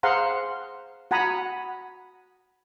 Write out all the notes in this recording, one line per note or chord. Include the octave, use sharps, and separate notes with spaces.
G#4 C5 F5 F#5 A#5 C6
F#4 F#5 G#5 A#5 B5 D#6